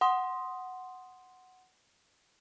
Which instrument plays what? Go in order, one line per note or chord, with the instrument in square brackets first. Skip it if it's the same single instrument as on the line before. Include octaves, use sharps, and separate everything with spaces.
[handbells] F#5 C6 D#6